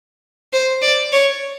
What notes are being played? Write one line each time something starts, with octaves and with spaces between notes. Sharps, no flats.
C5
D5
C#5